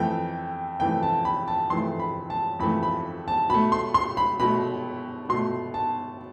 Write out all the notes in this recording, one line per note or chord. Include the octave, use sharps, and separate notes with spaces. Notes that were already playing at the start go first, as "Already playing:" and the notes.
Already playing: F2 E3 A3 G5
F2 E3 A3 G5
A5
B5
A5
F2 E3 A3 C6
B5
A5
F2 E3 A3 B5
B5
A5
B2 A3 B5
C6
C6
B5
B2 A3 B5
B2 A3 C6
A5